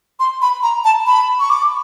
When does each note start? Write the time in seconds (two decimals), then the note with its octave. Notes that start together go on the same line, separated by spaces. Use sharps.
0.20 C6
0.42 B5
0.63 A#5
0.85 A5
1.07 B5
1.40 C#6
1.50 D6